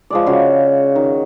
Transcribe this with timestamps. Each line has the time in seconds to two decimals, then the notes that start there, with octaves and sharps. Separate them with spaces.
0.10 F3 G#3 D5
0.26 C#3 F#4
0.96 D#3